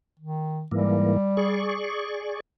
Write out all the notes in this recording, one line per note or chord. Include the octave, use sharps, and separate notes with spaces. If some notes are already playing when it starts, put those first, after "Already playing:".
D#3
G#2 E3 G3 A#3
G#4 D5 C#6